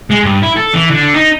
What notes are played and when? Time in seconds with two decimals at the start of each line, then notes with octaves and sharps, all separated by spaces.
0.10 G#3
0.24 G2
0.42 E4
0.56 A4
0.73 E3
0.91 D3
1.14 D#4